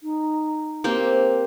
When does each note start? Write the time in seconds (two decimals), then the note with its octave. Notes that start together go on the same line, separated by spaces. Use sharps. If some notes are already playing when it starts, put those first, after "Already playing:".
0.03 D#4
0.84 A#3 C4 G4
1.04 C5